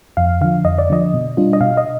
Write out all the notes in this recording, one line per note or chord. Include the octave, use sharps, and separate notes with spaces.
F2 F5
D3 F3 F5
F2 D#5
D5
D3 F3 D#5
B2
G3 D4 F4
D#5
B2 F5
D#5